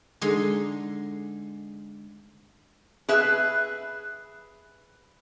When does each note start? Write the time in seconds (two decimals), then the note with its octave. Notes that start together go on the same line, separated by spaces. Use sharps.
0.21 D3 G#3 D#4 C6
3.09 G#4 B4 E5